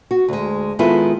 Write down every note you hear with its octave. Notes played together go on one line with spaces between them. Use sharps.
F#4
D2 G#3
D#3 G#3 B3 E4 F4 A4